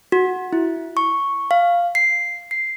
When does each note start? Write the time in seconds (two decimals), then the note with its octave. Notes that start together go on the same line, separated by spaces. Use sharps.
0.12 F#4
0.53 E4
0.97 C#6
1.51 F5
1.95 C7
2.51 C7